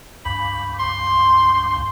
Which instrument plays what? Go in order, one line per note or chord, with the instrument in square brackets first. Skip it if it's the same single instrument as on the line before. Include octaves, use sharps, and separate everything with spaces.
[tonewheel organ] C#2 G2 [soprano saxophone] B5
[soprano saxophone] C6